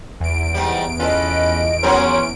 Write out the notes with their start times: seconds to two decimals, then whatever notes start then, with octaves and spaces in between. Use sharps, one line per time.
0.20 E2 D7
0.54 G#2 G3
1.00 C#4 F4 A4 B4 D#5
1.83 F3 F#3 B3 C#4 A#4 C6